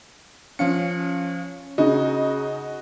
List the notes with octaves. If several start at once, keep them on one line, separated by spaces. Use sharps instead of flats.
F3 C#4 F5 C#7
C#3 D#4 F#4 D#5